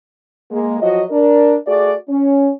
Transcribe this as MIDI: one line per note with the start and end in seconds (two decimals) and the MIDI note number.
0.51 0.79 56
0.51 0.79 58
0.80 1.03 53
0.80 1.03 54
0.80 1.03 66
0.80 1.03 75
1.11 1.55 62
1.11 1.55 70
1.66 1.94 57
1.66 1.94 66
1.66 1.94 68
1.66 1.94 74
2.08 2.50 61